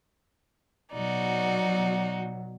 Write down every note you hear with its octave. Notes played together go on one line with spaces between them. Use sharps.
B2 F#3 D#4 F#4 D5